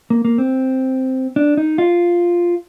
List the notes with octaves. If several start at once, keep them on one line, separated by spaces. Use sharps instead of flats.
A#3
A#3
C4
D4
D#4
F4